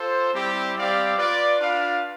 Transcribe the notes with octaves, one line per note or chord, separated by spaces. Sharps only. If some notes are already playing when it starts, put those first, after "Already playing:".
Already playing: F4 A4 C5
G3 C4 E4 G4
G3 C4 G4 D5 F5
F4 B4 D5
D4 F4 B4 F5